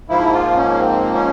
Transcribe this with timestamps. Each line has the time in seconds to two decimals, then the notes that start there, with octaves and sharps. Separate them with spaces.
0.08 G#2 F3 A#3 E4
0.33 F4
0.56 C#4
0.79 C4
1.15 C#4